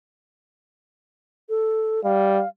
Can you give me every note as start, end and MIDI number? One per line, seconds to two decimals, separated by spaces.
1.49 2.03 69
2.04 2.42 55
2.04 2.48 77